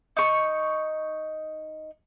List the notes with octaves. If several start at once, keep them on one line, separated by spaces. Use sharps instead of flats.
D#4 C#6